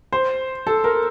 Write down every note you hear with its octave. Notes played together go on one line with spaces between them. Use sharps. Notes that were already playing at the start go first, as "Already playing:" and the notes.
C5
A4
A#4